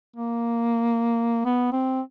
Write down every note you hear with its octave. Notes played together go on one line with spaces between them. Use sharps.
A#3
B3
C4